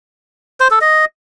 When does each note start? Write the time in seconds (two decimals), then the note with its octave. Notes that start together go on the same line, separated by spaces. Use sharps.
0.60 C5
0.71 A4
0.81 D#5